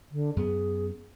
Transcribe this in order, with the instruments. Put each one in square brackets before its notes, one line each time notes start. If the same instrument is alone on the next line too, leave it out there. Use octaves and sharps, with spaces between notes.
[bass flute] D3
[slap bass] F#2 B3 [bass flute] G#4